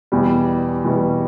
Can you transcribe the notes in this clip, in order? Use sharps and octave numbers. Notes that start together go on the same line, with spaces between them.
E2 B2 G3
E2 B2 G3